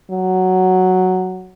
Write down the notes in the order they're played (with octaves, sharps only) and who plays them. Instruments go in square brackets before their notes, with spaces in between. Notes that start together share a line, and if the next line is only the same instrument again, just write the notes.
[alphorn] F#3